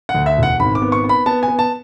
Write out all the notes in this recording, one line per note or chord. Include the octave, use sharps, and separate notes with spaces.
F#5
D2
E5
E1
F#5
G#1 B5
D6
B3
C#6
B3
B5
B3 A5
B3 G#5
A5